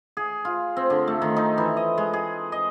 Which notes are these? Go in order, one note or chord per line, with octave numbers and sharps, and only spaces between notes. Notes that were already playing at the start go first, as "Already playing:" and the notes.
G#4
F4
C4
D3
A3
D#3
D#4
E3
D#5
G#3
G#4
D#5